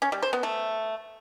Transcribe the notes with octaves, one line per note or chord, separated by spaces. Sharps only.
C#4
G3
C5
B3
A3